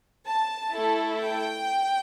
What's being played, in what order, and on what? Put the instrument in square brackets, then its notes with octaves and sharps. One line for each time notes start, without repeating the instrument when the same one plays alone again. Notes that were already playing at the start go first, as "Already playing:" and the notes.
[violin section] A5
A3 E4 A4
G5